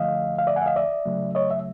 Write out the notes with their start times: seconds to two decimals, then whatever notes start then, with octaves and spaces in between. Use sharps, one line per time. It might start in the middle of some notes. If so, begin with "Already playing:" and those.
Already playing: D3 F3 A3 D#5 F5
0.38 F5
0.47 D5 E5
0.56 F#5 G#5
0.62 E5
0.66 D#5 F5
0.76 D5 E5
1.05 C#3 F#3 A3
1.35 C#5 D#5
1.51 E5